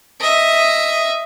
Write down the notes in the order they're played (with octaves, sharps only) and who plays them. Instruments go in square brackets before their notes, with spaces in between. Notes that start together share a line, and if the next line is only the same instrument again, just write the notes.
[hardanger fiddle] D#5 E5